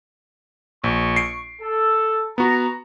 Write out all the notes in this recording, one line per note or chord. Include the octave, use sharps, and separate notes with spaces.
A#1 C#6
C7 D7
A4
B3 F#4 A#5